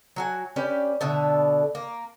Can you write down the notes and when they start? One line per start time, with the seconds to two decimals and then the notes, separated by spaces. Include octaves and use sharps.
0.16 F#3 F#4 G#5
0.56 C#4 G4 B4 D5
1.01 B2 D3 E5
1.75 A#3